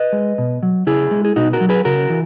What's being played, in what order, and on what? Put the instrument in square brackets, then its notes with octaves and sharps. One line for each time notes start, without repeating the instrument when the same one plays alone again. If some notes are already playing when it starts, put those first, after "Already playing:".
Already playing: [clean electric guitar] B4 D#5
G#3
B2
F#3
C#3 E4 G#4
G#3
G#4
B2 D#4 F#4
F#4 A#4
F#3
G#4 B4
C#3 F#4 A#4
E3